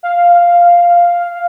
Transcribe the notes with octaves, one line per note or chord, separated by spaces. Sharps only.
F5